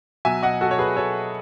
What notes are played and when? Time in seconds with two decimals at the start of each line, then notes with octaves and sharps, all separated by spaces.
0.25 B2 F#3 E5 G#5
0.43 D#5 F#5
0.61 F#4 A4
0.71 C#5
0.79 G#4 B4
0.97 A4 C#5